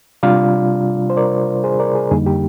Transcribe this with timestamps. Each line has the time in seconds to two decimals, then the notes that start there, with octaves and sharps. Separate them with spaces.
0.23 C3 G3 D4 F4 D5 F5
1.10 C5
1.17 A#4 D5
1.64 G#4 C5
1.79 A#4 D5
1.95 G#4
2.11 F2 D3 G3 A#3 D#4 G#4
2.26 G4